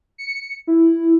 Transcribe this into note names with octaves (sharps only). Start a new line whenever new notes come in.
C#7
E4